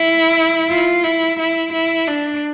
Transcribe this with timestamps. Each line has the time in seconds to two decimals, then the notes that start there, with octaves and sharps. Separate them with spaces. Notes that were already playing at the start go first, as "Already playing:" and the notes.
Already playing: E4
0.70 F4
1.04 E4
1.39 E4
1.72 E4
2.07 D4